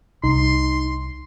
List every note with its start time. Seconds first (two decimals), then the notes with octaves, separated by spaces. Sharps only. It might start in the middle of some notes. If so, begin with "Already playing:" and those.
0.24 C2 D#4 C6